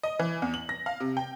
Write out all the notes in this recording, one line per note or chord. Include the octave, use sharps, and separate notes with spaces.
D#5
E3
E2
F#7
A#6
F5
C3
G5